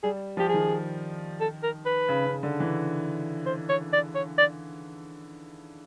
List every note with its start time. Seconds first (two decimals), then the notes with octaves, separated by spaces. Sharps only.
0.03 G3 G#4
0.37 F3 G4
0.49 G#4
0.54 D#3
1.40 A4
1.63 A#4
1.86 B4
2.08 C#3
2.26 C#3
2.43 D3
2.60 E3
3.46 C5
3.69 C#5
3.93 D5
4.15 C#5
4.38 D5